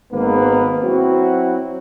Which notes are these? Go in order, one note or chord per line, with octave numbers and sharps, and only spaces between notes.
G#1 G#2 A#3 B3 B4
F#3 C4 E4 F#4